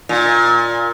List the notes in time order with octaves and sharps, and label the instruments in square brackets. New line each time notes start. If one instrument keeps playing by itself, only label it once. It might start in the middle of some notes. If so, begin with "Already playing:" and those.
[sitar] A#2